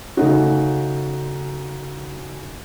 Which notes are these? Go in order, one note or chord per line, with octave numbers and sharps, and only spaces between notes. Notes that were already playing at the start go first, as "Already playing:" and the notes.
C#3 A3 D#4 F#4